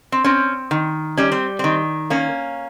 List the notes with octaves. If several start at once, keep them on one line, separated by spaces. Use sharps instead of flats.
C4
C4 C#4
D#3
G3 C#4
C4
D#3 C4
A#3 C#4